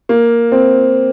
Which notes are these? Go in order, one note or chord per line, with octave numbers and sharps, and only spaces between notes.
A#3
C4